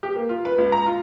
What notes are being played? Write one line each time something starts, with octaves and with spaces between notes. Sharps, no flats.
G4
A#3
F4
B4
C#2
A#5
F4